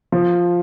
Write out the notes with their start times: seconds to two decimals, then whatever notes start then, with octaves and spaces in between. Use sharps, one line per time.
0.12 F3